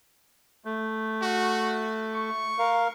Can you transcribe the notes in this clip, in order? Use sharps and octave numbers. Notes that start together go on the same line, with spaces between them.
A3
F#4
C#6
A#4 F5